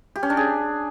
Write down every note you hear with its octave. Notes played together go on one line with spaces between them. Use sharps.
G4
C#4
D4
G#4